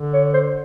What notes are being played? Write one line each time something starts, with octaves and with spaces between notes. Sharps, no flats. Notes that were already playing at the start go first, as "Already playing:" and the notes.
Already playing: D3
C#5
C5